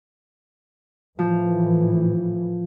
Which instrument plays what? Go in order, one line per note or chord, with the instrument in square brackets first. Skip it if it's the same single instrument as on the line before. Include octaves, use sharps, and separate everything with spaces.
[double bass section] A2 E3 [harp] F3